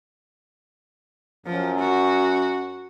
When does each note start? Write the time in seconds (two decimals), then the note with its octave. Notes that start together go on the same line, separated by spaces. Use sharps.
1.46 F#2 F3
1.79 F#4